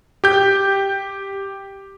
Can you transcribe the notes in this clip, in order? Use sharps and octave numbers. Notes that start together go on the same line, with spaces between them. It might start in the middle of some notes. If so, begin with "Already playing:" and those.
G4 G6